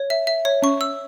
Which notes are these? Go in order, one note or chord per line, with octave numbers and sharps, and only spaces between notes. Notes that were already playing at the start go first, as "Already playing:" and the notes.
Already playing: C#5
E5
E5
C#5
C#4 C#6
E6